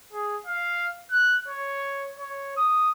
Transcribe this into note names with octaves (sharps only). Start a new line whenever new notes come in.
G#4
F5
F#6
C#5
C#5
D#6